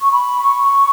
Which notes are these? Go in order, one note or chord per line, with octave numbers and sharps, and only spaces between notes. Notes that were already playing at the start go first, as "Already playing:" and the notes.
C#6
B5
C#6